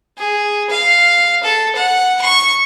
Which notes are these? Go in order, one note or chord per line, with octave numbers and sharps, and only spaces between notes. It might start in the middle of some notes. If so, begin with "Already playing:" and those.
G#4
F5
A4
F#5
C#6